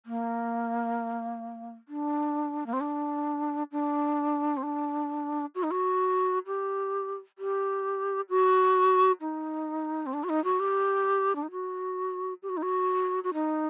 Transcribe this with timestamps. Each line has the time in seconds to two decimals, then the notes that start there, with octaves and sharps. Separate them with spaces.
0.06 A#3
1.89 D4
2.66 A#3
2.73 C4
2.81 D4
3.72 D4
4.57 C4
4.63 D4
5.55 F#4
5.63 D#4
5.71 F#4
6.47 G4
7.39 G4
8.30 F#4
9.21 D#4
10.06 C4
10.14 D4
10.24 F#4
10.29 D#4
10.44 F#4
10.60 G4
11.36 D4
11.43 D#4
11.51 F#4
12.43 G4
12.49 F#4
12.57 D#4
12.63 F#4
13.24 F#4
13.34 D#4